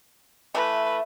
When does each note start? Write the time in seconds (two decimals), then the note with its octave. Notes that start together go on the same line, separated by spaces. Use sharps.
0.55 E3 A3 B4 E5